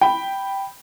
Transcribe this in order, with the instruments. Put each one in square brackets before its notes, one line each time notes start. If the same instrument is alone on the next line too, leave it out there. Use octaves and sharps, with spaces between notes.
[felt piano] G5 B5